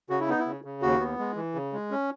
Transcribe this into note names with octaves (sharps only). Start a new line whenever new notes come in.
C#3 F#4
E4
B3 D#4
E4
C#3
C#3
D#2 F#4
B3
G#3
E3
C#3
G#3
C#4